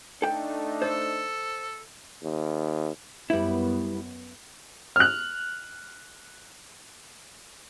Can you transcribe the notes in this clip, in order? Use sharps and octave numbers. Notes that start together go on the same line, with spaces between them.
A3 D4 D#4 A4 G5
A4 C5
D#2
F#2 G3 B3 E4
F6 F#6